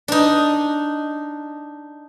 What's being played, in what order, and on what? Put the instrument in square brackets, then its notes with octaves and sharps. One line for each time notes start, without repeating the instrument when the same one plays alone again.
[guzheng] D4 D#4